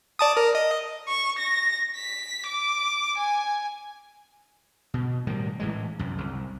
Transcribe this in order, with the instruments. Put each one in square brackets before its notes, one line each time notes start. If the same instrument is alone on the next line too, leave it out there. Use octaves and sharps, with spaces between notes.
[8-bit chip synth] D5 A5 D#6
A#4
D#5
[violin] C#6
A#6
B6
D6
G#5
[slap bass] B2
A2 D#3 G3
A2 E3 G#3
C2 F#2
C2